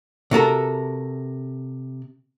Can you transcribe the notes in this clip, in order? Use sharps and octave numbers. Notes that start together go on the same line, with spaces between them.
C3 F#4 A4 A#4